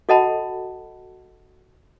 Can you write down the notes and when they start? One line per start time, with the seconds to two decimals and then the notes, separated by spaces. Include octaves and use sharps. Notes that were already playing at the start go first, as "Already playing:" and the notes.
0.09 F#4 A4 D#5 F#5 A5 B5